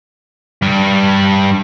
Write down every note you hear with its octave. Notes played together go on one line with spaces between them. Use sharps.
G2 G3